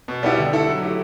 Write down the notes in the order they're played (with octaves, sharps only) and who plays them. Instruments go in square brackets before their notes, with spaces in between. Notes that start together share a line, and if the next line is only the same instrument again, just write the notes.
[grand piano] B2
G3 B3 E4 G4
D3
A3 E4 A4
F#3
A3 E4 G4